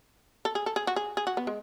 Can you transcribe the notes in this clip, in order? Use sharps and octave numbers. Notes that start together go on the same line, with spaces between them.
A4
G#4
A4
G#4
F#4
G#4
G#4
F#4
B3
G#3